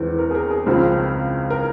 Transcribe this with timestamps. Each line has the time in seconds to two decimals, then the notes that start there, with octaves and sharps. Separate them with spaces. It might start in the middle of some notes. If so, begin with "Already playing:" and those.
Already playing: E2 E3 G#3 C4
0.18 A#4
0.31 G#4
0.35 A#4
0.50 G#4
0.66 C#2 C#3 F3 C4
1.50 A#4